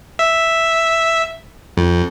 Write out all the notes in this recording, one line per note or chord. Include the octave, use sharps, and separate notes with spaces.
E5
F2